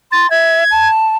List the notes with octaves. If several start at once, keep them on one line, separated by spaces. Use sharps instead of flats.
C6 A6
E5 G#6
A5